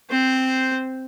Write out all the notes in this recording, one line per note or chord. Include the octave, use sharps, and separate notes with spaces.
C4 C5